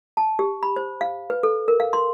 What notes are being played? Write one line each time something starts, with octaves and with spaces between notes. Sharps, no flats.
A5
G4
B5
C5
F5
B4
A4
A#4
F5
C6